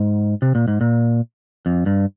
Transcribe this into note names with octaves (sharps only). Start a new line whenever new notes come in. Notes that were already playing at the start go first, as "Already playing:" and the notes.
Already playing: G#2
C3
A#2
G#2
A#2
F2
G2